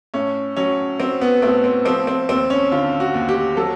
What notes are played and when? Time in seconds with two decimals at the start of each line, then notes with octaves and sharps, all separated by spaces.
0.14 A2 C#4
0.56 F#3 C#4
1.00 F#3 C4
1.21 B3
1.42 A2 C4
1.64 C4
1.85 F3 C4
2.07 C4
2.29 D#2 C4
2.50 C#4
2.71 D3 F4
3.00 F#4
3.14 D#2
3.29 G4
3.57 F#3 A4